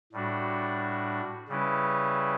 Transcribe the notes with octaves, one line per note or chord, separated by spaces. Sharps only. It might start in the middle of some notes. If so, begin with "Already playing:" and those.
A2 G3 D4 F#4
C#3 G3 C#4 E4 B4